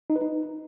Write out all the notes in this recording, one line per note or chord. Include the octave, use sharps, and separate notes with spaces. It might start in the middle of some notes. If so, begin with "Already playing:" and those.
D#4
B4
D#4